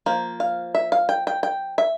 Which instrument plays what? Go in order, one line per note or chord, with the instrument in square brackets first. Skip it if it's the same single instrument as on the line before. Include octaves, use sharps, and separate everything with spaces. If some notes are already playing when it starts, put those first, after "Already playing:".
[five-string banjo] F3 A#3
F5
E5
F5
G5
G5
G5
E5